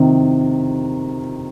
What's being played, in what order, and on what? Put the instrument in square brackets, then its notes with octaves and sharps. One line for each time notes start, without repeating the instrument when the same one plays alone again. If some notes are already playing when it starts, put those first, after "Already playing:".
Already playing: [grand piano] C3 D#3